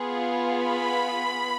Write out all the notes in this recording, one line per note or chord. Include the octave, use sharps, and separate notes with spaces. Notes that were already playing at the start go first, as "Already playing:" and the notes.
Already playing: B3 F4 G#4
B5